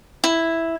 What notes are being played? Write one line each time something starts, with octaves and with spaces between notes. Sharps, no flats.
E4